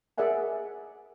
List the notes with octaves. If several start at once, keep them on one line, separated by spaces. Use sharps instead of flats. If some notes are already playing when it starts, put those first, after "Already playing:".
G#4 A#4 D5 E5 F#5 G#5